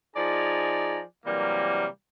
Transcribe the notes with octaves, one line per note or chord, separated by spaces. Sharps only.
F3 D#4 G#4 D5 G#5 A#5
C3 E3 F#3 G3 A#3